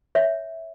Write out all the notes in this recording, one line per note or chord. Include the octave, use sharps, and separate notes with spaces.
C#5 E5